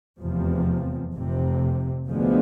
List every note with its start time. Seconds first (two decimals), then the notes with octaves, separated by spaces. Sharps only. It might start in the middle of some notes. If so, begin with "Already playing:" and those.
0.21 F1 E2 C3 F3
1.15 F1 F2 C3
2.08 D2 D3 F3 G#3 B3